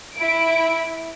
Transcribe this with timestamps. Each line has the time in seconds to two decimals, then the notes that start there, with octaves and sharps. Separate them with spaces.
0.15 E4 D7